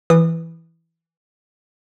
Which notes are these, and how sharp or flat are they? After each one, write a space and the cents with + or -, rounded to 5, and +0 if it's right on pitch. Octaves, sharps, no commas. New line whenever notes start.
E3 +0 D#6 -30